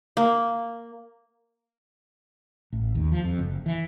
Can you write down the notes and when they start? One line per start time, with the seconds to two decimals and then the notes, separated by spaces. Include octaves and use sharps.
0.17 A#3
2.73 A1
2.95 D#2
3.12 F3
3.24 F2
3.39 F#1
3.66 E3